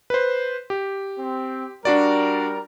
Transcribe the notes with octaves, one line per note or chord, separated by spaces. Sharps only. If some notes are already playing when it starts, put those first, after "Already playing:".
B4 C5
G4
C4
G3 D4 F#4 A#4 D5